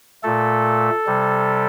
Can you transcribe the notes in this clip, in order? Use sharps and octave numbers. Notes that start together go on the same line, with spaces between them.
A#2 A3 A4
C3 G3